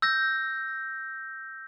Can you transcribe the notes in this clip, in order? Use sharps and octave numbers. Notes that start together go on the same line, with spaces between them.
E6 G6 A#6